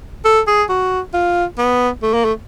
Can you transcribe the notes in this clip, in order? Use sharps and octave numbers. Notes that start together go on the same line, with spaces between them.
A4
G#4
F#4
F4
B3
A3
A#3
A3